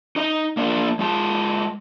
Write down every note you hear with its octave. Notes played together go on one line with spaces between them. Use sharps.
D#4 D#5 A#5
A#3 D4 F4 A#4
G#3 F4 A5